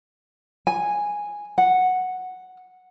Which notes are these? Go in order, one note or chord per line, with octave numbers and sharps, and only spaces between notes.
G#5
F#5